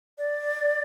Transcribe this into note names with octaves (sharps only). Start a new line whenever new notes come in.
D5